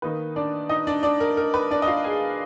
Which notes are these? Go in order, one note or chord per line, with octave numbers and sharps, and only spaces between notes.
D#3 A#3 D#4 B4
D4 D5
D#4 D#5
D4 D5
D4 D5
A#4
A#4
B4
D4 D5
D#5
F4 F5
G#4 G#5